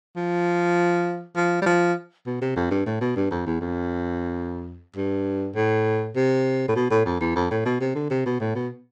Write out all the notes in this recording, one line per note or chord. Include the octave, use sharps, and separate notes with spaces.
F3
F3
G3
F3
B2
C3
F2
G2
A2
B2
G2
F2
E2
F2
G2
A2
C3
A2
B2
A2
F2
E2
F2
A2
B2
C3
D3
C3
B2
A2
B2